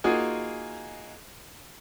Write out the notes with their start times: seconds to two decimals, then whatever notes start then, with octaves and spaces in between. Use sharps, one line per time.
0.04 A#3 D#4 F4 F#4 G#4 G#5